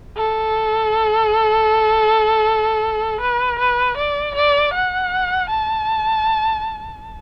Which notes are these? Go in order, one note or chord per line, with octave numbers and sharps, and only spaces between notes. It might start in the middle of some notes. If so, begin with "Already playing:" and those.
A4
B4
B4
D5
D5
F#5
A5